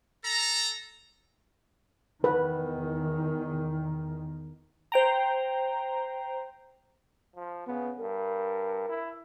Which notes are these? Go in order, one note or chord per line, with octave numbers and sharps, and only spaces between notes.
A4 A#5
E2 D#3 B4
C5 G5 A#5
F3
C#3 B3
G2 A#4
E4